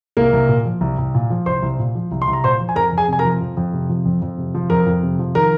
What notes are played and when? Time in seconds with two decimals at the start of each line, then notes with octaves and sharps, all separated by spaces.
0.17 C2 A#3 A#4
0.33 C2
0.49 A#2
0.65 F3
0.81 C2
0.98 C2
1.15 A#2
1.30 F3
1.46 C2 C5 C6
1.63 C2
1.79 A#2
1.95 F3
2.12 C2
2.22 C6
2.28 C2
2.33 A#5
2.44 A#2 C5 C6
2.59 F3
2.69 G#5
2.76 F2 A#4 A#5
2.92 F2
2.97 G#4 G#5
3.08 C3 G#5
3.19 A#4 A#5
3.25 F3
3.41 F2
3.57 F2
3.73 C3
3.89 F3
4.05 F2
4.22 F2
4.38 C3
4.54 F3
4.70 F2 A#4 A#5
4.86 F2
5.03 C3
5.19 F3
5.35 D#3 A#4 A#5